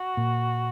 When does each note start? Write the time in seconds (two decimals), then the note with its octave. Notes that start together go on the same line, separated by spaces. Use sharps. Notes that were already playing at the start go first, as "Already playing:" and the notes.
Already playing: F#4
0.17 A#2